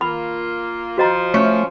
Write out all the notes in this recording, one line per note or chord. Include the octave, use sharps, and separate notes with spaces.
A#3 F4 B5
F3 F#4 C5 D#5 A#5
A3 C#4